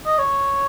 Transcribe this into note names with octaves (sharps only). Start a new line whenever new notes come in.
D#5
C#5